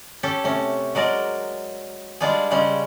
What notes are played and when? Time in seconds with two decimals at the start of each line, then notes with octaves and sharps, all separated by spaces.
0.23 C#4 G4 A4
0.44 C3 A3 C#4
0.95 F#3 G#3 A#4 D5
2.21 G3 G#3 D4 F4 G#4
2.51 C#3 G3 G#3 C#4